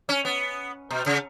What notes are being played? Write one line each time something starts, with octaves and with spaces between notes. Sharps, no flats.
C#4
B3
B2
C#3